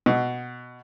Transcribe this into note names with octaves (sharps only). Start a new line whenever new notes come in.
B2